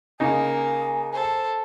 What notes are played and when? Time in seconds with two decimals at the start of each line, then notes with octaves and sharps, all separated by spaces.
0.20 C#3 A#3 D#4 G#5
1.13 A4 C5